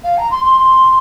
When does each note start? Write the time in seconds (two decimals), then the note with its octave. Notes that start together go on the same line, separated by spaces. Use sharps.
0.03 F5
0.17 A#5
0.30 C6
0.44 C6
0.57 C6